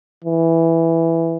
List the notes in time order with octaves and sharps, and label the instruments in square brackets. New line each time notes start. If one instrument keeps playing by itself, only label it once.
[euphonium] E3